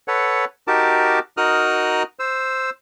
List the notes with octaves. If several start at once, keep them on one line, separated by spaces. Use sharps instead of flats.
A4 B4 C#5 F#5
D#4 F#4 G4 A#4 A5 D6
D#4 F#4 A#4 D#6 F6 F#6
C5 E6